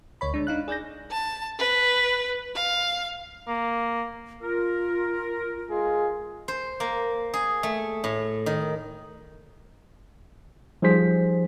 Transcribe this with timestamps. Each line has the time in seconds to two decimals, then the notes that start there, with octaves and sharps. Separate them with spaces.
0.21 D2 C#5 B5
0.34 G#3 D4
0.47 D4 D#4 F5 F#6
0.68 G#4 D5 F#6 G6 A#6
1.11 A5
1.59 B4
2.55 F5
3.48 A#3
4.41 F4 A#4
5.70 G#3 F4 G#4
6.48 C5
6.80 A#3
7.34 G#4
7.63 A3
8.04 A2
8.46 D#3
10.82 F3 G3 D#4 G#4 C5 B6